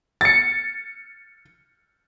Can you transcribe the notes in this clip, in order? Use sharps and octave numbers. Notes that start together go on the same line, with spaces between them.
A6 C#7